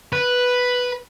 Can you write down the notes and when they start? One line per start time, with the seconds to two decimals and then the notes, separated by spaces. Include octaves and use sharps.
0.13 B4